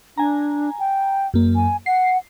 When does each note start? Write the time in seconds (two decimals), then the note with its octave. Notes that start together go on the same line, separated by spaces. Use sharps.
0.18 D4 G#5 A#5
0.79 G5
1.34 F#2 A#3
1.56 G#5
1.86 F#5 C7